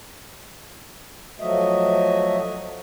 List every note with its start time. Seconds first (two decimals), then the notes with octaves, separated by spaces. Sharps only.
1.40 F3 F#3 A3 F#4 D#5 E5